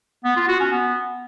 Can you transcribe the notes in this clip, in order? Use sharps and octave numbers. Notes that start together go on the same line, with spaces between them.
B3
F4
F#4
C#4
B3